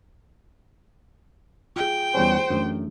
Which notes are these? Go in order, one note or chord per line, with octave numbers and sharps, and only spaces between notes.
F4 G#4 G5
E2 G3 C#4 C5
F#2 E3 A3 D4